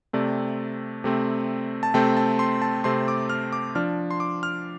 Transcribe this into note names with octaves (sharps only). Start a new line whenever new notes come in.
C3 A3 C4 D5
C3 A3 C4
A5
C3 A3 C4 G5
A5
C6
A5
C3 A3 C4 C6
D6
F6
D6
F3 D4 F6
C6
D6
F6